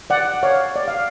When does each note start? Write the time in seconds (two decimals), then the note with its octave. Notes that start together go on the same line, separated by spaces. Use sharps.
0.10 D5 F#5
0.43 C#5 F5
0.76 D5
0.88 F5